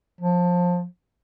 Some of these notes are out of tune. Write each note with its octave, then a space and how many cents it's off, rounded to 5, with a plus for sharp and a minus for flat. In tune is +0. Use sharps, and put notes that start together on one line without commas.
F3 +25